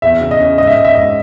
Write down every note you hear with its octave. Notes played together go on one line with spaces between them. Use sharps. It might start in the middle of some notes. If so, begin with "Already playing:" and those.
E2 E5
C#3
D#5
C#4
G#2 D#5
E5
G#2 D#5
E5
G#2 D#5